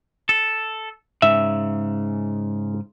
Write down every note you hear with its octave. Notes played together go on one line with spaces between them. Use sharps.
A4
G#2 C#3 E5